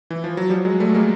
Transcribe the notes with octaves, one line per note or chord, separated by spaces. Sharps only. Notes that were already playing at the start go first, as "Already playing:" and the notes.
E3
F3
F#3
F3 G3
F#3 G#3
G3 A3
G#3 A#3